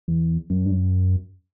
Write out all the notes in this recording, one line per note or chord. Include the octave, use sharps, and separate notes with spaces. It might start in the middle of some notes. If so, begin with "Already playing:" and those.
E2
F#2
G2
F#2